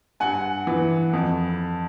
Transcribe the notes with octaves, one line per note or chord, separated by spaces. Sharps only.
G2 F#5 G#5
E3
F2